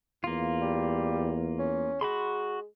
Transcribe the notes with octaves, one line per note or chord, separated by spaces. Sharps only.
E2 A#3 F4
G3
C#4
G#3 F#4 B5 C6